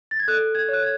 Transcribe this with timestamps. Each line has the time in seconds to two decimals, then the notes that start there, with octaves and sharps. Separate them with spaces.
0.11 A6
0.19 G#6
0.28 A4 F#6
0.55 G#6
0.68 C#5 F#6
0.82 G#6